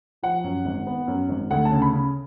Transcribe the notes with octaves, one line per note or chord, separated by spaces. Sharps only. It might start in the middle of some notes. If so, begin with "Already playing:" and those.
F3 F#5
F#2
G#1
B3
F#2
G#1
D2 F#5
A5
C#3
B5
C#3